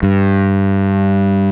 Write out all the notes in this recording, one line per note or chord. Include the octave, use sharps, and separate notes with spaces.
G2